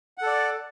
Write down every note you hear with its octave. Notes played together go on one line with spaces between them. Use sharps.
A4 D5 F#5